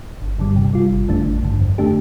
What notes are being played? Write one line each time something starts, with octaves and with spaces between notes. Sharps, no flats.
G1
G2 D3 G3
C3
G3 F4
G1
F2 D3 A3 D4
A1
G2 D3
F2
D3 A3 D4 G4